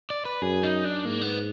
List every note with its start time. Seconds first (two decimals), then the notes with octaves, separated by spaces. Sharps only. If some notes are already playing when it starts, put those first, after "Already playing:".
0.10 D5
0.25 B4
0.42 F#2 G#4
0.63 D#4
0.85 D4
1.05 G#2 A#3
1.21 B3